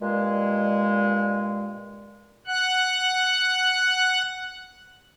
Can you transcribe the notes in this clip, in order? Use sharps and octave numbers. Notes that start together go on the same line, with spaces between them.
G2 A#2 G#3
F#5 F#6